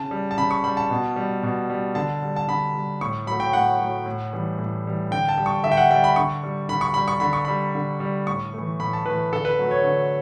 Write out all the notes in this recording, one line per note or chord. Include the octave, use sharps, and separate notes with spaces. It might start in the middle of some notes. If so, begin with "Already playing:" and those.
Already playing: C#3 A5
G3
A5
C#3 B5
C#6
G3 B5
A5
B2
G3
B2
G3
D3 A5
G3
A5
D3 B5
G3
A2 C#6
F#3 A3 B5
G5
A2 F#5
F#3 A3
A2
E3 G3
A2
E3 G3
D3 G5
A5
G3
C#6
D3 E5
G5
F#5
G3 G5
B5
D3 C#6
G3
D3 B5
C#6
G3 B5
C#6
D3 B5
C#6
G3 B5
D3
G3
A2 C#6
E3 A3
A2 B5
A5
E3 A3 B4
D3 A4
B4
F#3 A3
C#5
D3